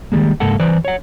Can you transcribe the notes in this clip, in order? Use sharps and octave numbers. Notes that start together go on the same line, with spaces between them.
D#3 G3 G#3 A#3
C#2 G#2 A#3 A4 F#5
E3 B4 C5 D5
C#5 F#5